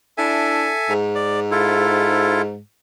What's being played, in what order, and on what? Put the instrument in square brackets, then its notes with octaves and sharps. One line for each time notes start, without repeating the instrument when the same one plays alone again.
[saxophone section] D4 E4 [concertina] A4 E5 G#5
[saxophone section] G#2
[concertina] D5
E4 F4 A4